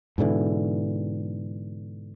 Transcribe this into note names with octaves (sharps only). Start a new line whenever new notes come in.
G#2 B2 D3 E3